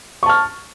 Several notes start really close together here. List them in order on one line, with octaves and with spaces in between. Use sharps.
C#6 A5 F6